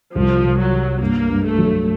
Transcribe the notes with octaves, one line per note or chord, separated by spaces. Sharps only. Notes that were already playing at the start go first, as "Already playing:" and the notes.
C2 F3
C2
F#3
G3
G2 A#3
G2
A3
F#3